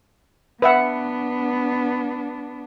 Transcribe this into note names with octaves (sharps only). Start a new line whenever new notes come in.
B3 D4 B4 E5 F#5